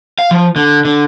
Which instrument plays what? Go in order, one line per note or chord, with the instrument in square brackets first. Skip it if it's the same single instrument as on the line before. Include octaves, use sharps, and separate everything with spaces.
[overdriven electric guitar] F5
F3
D3
D3